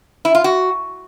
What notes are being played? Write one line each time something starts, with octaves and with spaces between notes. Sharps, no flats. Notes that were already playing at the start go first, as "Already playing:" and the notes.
E4
F4
F#4